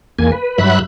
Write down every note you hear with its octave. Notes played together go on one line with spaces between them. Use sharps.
E2 A#3 G#5
B4
G2 F#3 E5 B5 F#6